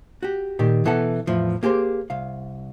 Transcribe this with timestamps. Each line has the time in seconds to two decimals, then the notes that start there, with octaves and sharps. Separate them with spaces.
0.23 F#4 G4
0.59 A#2 D#3 G4
0.85 B2 E3 B3 A4 F#5
1.27 E2 A2 F3
1.63 A#3 G4 G#4 C5
2.10 C2 F5